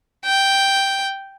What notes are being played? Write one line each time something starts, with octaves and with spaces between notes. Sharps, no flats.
G5